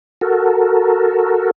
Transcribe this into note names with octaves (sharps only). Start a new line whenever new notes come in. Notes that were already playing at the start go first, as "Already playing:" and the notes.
F#4 A4 A#4